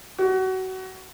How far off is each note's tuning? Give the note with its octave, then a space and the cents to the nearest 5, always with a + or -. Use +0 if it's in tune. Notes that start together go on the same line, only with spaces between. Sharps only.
F#4 +25